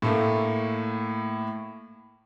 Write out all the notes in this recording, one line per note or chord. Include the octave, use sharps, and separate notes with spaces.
A2 A3 A#3